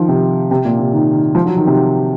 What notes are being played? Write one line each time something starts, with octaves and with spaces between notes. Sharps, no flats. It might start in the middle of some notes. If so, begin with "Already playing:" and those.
Already playing: D#3 F3
C3
C3
A#2
C3
D#3
D#3
F3
F#3
D#3
C3